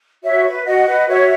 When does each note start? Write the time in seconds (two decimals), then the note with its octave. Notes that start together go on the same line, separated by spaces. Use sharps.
0.23 F#4 C#5 E5
0.45 B4
0.65 F#4 D#5 F#5
0.87 B4
1.08 F#4 C#5 E5